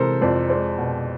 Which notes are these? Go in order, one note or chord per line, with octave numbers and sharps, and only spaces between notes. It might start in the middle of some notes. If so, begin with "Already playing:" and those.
Already playing: C3 E3 G#3 A4 A#4 C5
F2 C5 D5
G#3 C5 D5
B2